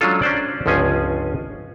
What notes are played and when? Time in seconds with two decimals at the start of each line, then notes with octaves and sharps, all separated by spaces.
0.01 F#3 G#3 C#4 D4 F4 A4
0.22 C#4 D4 C5 D5
0.66 G1 C#2 F3 C#4 G#4 G#5